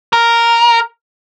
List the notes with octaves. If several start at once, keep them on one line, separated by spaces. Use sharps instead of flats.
A#4